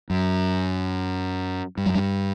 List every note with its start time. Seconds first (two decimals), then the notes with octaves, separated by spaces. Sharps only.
0.10 F#2
1.77 G2
1.86 F#2
1.95 G2